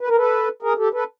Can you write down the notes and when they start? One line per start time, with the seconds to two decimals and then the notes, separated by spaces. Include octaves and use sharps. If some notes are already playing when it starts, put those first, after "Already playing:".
0.01 B4
0.08 A#4
0.16 A4 B4
0.62 G#4 A#4
0.77 G4 A4
0.93 A4 B4